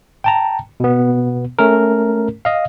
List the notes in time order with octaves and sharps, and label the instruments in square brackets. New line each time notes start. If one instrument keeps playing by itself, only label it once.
[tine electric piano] G5 A5 A#5
B2 B3
A3 C#4 A#4
D#5 F5